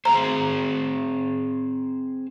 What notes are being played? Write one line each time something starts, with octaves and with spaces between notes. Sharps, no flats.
C4 G#4 C5 A#5